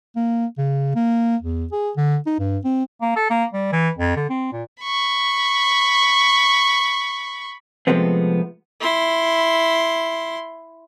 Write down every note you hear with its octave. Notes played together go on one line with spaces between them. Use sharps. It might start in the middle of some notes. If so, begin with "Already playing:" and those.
A#3
C#3
A#3
E2
G#4
D3
D#4
G2
C4
A#3
A4
A#3
G3
E3
F2
D3
C4
A#2
B5 C#6
C3 F3 G#3 A3 B3 C4
E4 C6